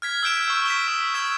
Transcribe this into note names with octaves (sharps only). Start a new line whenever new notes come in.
F6 G#6 B6
E6 G6 D7 E7
C#6 E6
B6 E7 G7
D#6
E6 G#6 E7